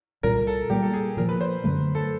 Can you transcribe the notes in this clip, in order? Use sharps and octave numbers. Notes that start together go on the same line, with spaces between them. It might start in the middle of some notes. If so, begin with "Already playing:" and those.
C2 A#2 G3 A#4
A4
A#2 G3 A#3 G4
A4
G#4
A#2 F3 A#3 A#4
B4
C5
F#2 D3 F#3 A3 B4
A4